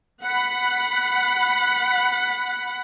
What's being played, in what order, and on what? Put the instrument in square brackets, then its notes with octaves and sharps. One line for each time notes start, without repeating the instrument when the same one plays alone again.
[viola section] F#5 B5